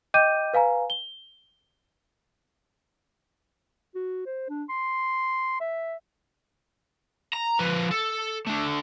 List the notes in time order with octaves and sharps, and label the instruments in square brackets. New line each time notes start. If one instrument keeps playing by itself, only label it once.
[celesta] D#5 G5 D6 G6 D#7
B4 F5 G#5 A#5
G7
[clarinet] F#4
C5
D4
C6
E5
[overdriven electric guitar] A#5
F3 B4
A4
A3 D4